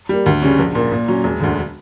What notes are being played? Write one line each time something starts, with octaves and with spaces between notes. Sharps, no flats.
G3 A#3
D2
C#3 G3 C#4
A#1
A#2 A#3
A#2
F#3 C#4
E1
D2 D3